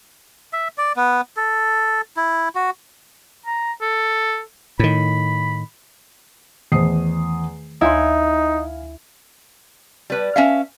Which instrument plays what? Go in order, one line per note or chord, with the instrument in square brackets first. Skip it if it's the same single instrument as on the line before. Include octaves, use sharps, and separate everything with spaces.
[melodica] E5
D5
B3
A4
E4
F#4
[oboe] A#5
A4
[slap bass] A2 D#3 [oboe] B5
[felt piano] E2 D#6 C7 [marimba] D#3 A3 C5
[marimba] D2 C#5 C6 [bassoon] D#4 [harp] E4 [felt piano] F5 G#5
[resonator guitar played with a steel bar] G3 B4
C#4 E5 F5